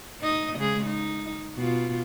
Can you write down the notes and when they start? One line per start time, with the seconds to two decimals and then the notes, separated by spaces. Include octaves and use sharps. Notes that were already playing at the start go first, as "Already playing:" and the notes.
0.20 D#4 D#5
0.57 C#3 G#3 G#4
0.86 D#4
1.56 B2 F4